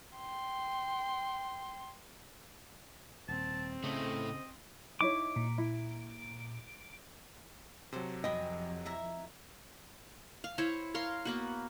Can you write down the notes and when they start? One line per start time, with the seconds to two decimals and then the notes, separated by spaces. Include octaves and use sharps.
0.18 G5 C6
3.28 D#1 C4 A5
3.84 A2 C#3 A3 D#5
5.01 D#4 E4 C#5 D6
5.36 A#2
5.58 E4
7.92 C3 F#3 A4 C5
8.24 F2 D#5 G5 G#5 B5
8.86 E4 E5 A#5
10.44 F5
10.58 E4 C5 C#5
10.94 A#4 C#5 F5 C6
11.25 A#3 B3 F#4